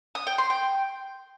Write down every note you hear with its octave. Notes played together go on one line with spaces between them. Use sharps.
D#6
G5
C6
G5